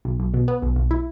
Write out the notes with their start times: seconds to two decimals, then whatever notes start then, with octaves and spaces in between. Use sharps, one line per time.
0.05 B1
0.20 B1
0.34 B2
0.48 B3
0.62 B1
0.76 B1
0.91 E4